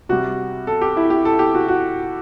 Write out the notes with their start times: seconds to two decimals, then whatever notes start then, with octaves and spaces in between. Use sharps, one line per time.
0.09 C3 G3 F#4
0.67 A4
0.82 G4
0.97 E4
1.10 G4
1.25 A4
1.39 G4
1.54 F#4
1.68 F#4